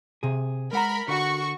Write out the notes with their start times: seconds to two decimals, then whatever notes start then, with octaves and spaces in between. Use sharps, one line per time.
0.23 C3 G#4
0.73 G#3 A#4 F#5 A#5 B5
1.08 D3 F#4 C#6